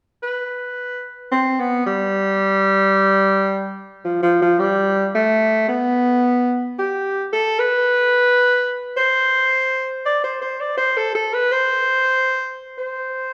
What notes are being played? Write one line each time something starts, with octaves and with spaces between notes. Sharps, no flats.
B4
C4
B3
G3
F3
F3
F3
G3
A3
B3
G4
A4
B4
C5
D5
C5
C5
D5
C5
A4
A4
B4
C5
C5